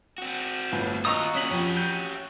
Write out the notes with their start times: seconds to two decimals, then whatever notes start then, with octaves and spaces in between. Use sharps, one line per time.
0.18 C4 F#4
0.72 G1 A2
1.05 D#2 F4 F#4 D#5 A#5 C#6 D#6 E6
1.34 A#2 F#3 C#4 B6 F#7
1.51 F2 C#4 G4
1.77 G6